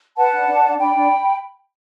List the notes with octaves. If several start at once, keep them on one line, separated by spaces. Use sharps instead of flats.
B4 F#5 A5
D4
D4
D4
D4 G5 B5
D4